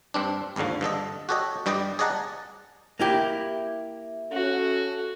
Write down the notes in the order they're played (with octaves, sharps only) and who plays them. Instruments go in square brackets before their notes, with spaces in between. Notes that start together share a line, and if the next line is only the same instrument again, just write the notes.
[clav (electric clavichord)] G2 C4 D4
G#1 D#2 G#2 D3 F3
G2 D3 A4 D#5
F#4 G4 A4 C#5 D#5
G2 G3 G4 D5 D#5
G#4 D5 D#5 F#5 A5 A#5
[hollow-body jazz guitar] A#3 E4 G4 [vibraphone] E5
[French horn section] C#4 A4 [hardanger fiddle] F#4